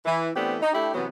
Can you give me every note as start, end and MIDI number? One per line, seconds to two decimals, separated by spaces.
0.06 0.29 52
0.36 0.56 52
0.36 0.56 57
0.36 0.56 59
0.36 0.56 60
0.36 0.56 62
0.36 0.56 67
0.61 0.73 63
0.73 0.91 57
0.73 0.91 62
0.73 0.91 64
0.73 0.91 67
0.94 1.07 48
0.94 1.07 52
0.94 1.07 54
0.94 1.07 59